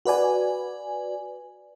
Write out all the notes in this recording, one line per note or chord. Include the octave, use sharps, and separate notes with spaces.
F#4 B4 D5 G#5